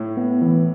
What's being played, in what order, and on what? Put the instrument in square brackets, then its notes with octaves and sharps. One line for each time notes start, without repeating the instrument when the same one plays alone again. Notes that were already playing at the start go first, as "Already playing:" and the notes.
Already playing: [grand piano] A2
[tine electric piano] B3
E3